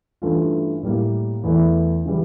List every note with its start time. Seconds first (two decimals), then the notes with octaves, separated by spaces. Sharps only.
0.22 G2 E3 A3 C#4 F4
0.83 A2 G3 A#3
1.43 E2 E3 A3 E4
2.05 C#3 E3 G3